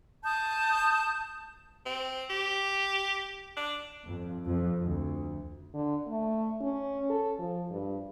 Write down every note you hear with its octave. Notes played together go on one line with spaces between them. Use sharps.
A5 D#6 G6
C4
G4
D4
F2
F2
D2
D3
A3
C#4
A4
F3
G2